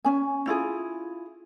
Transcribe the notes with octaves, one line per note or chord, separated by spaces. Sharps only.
C#4 G#5
E4 F4 G#4